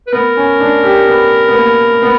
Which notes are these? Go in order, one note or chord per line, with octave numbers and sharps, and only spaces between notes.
B4
B3 A#4
C#4
D4
G4
B3
B3
A#3
B3